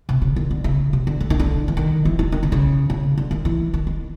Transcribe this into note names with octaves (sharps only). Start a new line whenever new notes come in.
C3
C#3
D#3
D3
C#3
C3
D3
D3
D#3
D3
E3
D#3
E3
D#3
D#3
D3
C#3
C#3
D3
D#3
E3
D#3
D#3